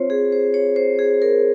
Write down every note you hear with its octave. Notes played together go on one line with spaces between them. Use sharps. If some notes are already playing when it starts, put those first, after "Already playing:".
Already playing: C4 F4 C5 C#5
G#4
C5
C#5
C5
G#4
A#4